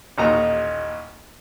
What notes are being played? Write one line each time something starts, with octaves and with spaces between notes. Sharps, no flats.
A1 D#2 A#2 D#4 A#5